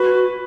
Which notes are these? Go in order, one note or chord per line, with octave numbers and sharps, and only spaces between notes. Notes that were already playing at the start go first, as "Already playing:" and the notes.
Already playing: F#4 B4